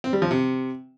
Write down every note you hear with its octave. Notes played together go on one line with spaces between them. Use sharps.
C4
G3
F3
C3